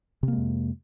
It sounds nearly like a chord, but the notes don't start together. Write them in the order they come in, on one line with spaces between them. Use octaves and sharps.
C3 A#3 G#3 F2